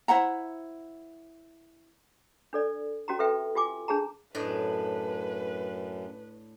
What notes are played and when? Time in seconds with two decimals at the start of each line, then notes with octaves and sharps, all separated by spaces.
0.08 E4 C5 F#5 A#5
2.53 D4 A4 D5
3.08 C#4 F#4 G4 A#5
3.19 A4 B4 E5 G5
3.55 F4 G4 G#5 D6
3.88 D4 G#4 A5 A#5
4.35 F#2 A2 D4 B4 D#5